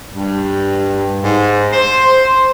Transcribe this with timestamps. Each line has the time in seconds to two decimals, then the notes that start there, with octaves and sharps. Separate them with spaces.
0.14 G2
1.24 G#2
1.73 C5